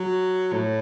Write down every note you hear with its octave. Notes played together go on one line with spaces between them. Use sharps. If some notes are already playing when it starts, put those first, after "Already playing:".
Already playing: F#3
A2